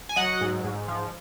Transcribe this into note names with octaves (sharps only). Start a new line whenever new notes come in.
G#5
F#3 D#5 F#5
G#2
G#2
F3